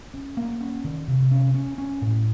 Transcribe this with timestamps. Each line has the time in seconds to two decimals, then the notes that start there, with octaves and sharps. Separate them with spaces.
0.14 C#4
0.37 A#3
0.61 C#4
0.84 D#3
1.08 C3
1.31 C#4
1.54 C#4
1.78 C#4
2.02 A2